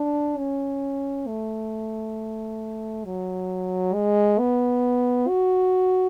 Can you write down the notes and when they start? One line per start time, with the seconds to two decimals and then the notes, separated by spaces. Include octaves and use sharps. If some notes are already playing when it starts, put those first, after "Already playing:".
Already playing: D4
0.38 C#4
1.27 A3
3.05 F#3
3.94 G#3
4.39 B3
5.28 F#4